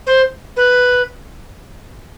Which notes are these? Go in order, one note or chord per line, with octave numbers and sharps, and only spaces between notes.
C5
B4